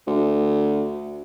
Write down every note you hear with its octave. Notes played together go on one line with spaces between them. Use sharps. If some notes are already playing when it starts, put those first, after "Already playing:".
D2